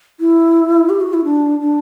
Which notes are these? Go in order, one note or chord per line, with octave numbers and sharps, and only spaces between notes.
E4
G4
F#4
E4
D4
D4